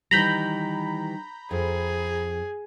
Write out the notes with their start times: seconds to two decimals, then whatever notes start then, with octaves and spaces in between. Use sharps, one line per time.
0.11 D#3 E3 G3 A#5 B5 G6
1.51 F2 G#4